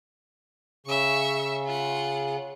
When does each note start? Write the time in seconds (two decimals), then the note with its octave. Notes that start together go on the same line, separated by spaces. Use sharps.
0.86 C#3 E5 C#6
1.66 F4 F#5